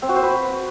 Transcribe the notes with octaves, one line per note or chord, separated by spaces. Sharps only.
C4
F#4
C5
B4